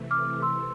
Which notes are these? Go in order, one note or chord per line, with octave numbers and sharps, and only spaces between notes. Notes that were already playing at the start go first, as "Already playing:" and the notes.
Already playing: C3 E3 A3
D6 F6
C6 E6